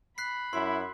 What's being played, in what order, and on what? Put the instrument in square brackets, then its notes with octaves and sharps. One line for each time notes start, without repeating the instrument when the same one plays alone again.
[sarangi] B5 [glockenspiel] F#6 B6 C7
[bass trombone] F#2 [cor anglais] E4 [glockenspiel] C6